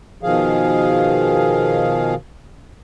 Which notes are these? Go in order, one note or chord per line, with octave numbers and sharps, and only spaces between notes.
B2 D#3 F3 G#4 F5